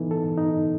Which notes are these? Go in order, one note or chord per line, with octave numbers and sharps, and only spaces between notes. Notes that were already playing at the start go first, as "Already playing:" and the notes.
Already playing: E3 B3 D#4 A4
A4
D#4